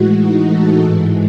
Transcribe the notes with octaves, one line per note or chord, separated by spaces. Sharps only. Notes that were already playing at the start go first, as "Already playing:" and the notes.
Already playing: A2 E3 G#3 F#4
D#4
A4
G#2 E3 G#3